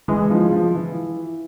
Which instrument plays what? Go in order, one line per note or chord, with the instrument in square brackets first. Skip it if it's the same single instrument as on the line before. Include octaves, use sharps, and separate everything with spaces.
[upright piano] E3 [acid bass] G#3
[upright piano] F3
F3
E3